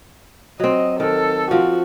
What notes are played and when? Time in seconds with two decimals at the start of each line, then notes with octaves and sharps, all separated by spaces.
0.60 F#3 C4 D#5
1.00 D#3 A4
1.51 F3 C4 F#4